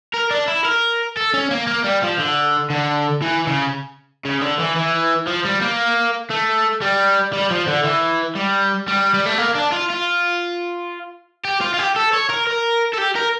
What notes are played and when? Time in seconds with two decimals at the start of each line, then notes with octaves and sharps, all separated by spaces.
0.14 A#4
0.31 D4
0.48 E4
0.65 A#4
1.17 A4
1.34 C#4
1.51 A#3
1.67 A#3
1.84 G3
2.03 F3
2.19 D3
2.70 D3
3.22 E3
3.47 C#3
4.25 C#3
4.41 D3
4.59 E3
4.76 E3
5.27 F3
5.45 G3
5.61 A#3
6.30 A3
6.82 G3
7.33 G3
7.51 F3
7.67 D3
7.84 E3
8.36 G3
8.88 G3
9.14 G3
9.26 A3
9.38 A#3
9.55 D4
9.73 F4
9.90 F4
11.45 G4
11.61 F4
11.74 F4
11.79 G4
11.96 A4
12.13 C#5
12.30 A#4
12.47 A#4
12.94 A4
12.98 G4
13.16 A#4